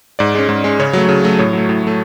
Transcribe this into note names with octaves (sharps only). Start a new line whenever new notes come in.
G#2 D5
G#3 C#4
G#2
G#3 C#4
C#3 C#5
F#3 A3
C#3
F#3 A3
A2 C#5
F#3 A3
A2
F#3 A3